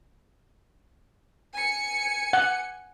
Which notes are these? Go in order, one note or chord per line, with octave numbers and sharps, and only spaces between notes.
G#5 C#7
F#5